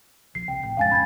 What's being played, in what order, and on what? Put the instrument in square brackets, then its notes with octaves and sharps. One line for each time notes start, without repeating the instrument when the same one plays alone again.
[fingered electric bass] A#1 [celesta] C7
[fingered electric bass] C2 [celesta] G5
[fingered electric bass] A1
[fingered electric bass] A#1 F#2 G#3 [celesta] F5 G#5 A6
[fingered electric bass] G#1 F2 C#4 [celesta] B5 G#6 A6